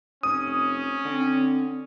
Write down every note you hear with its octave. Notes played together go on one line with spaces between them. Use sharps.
F1 C#4 D#6
D3 C4